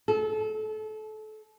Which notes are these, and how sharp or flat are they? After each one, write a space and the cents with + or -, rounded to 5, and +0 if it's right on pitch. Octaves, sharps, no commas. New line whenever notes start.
A4 -30